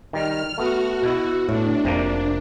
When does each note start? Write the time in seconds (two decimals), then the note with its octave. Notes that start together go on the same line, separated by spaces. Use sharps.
0.13 D#3 G3 F6
0.58 A3 B3 F#4
1.02 B2 E4
1.49 A2 D4
1.85 F1 C3 F3 A#3